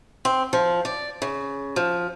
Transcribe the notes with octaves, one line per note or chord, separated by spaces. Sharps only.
C4
F3
D5
C#3
F3